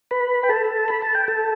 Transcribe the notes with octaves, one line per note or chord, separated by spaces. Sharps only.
B4 B5
G5
A4 A5
B5
A5
G5
A4 A5